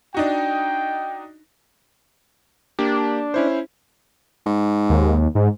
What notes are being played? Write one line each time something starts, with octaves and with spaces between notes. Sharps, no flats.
D4 D#4 F#4 G5
A#3 D4 G4
C#4 E4 C5
G#2
D#2
G#2